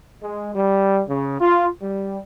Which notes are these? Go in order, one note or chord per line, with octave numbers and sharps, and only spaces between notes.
G#3
G3
C#3
F4
G3